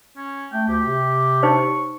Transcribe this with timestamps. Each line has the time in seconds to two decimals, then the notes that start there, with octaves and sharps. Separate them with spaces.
0.17 C#4
0.53 A3 G5
0.68 D2 G4
0.86 C3
1.43 D#4 C5 C#5 C#6